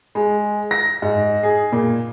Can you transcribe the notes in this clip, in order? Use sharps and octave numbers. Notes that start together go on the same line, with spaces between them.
G#3
A#6
G#2
G#4
A#2